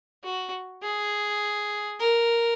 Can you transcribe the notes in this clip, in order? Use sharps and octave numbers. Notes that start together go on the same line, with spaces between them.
F#4
G#4
A#4